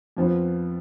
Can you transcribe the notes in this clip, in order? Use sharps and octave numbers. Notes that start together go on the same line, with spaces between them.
F2 F3 B3 F4